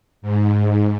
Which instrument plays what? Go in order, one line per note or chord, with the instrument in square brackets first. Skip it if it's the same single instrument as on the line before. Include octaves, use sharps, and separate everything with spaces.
[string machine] G#2